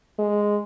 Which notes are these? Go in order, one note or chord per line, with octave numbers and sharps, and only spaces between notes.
G#3